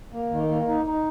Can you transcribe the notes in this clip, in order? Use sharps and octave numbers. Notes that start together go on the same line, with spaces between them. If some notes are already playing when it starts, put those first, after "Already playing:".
A#3
D#3
A#3
D#4
D#4